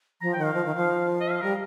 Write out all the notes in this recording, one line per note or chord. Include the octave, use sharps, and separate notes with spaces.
F3 A#5
G5
D#3
F5
F3
D#3
F3
D#5
F5
G3 A#4